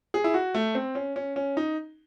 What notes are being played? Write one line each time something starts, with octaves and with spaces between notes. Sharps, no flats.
G#4
E4
F#4
A3
C4
C#4
C#4
C#4
D#4